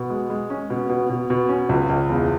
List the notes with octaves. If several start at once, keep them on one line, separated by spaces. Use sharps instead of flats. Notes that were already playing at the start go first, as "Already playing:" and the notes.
Already playing: B2
G#3
G#3
C#4
B2
B2
B2
B2
C#4
C#2
C#2
E1